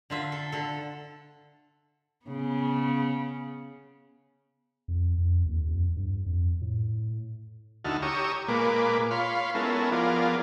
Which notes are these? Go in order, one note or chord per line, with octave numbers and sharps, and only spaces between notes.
D3 F4 E5
A4
D3 A4
C#3 B3
F2
F2
D#2
F2
G2
F2
A2
D2 D#4 E4 F#4 A5 F6
G4 C#5 A#5 C#6 D#6 E6
A#2 G#3 A#3 B4 D6
F4 C#5 F5 B5 C6
G#3 B3 C#4 E4 A4 A#4
F3 B3 F4 G#4 A#4 D5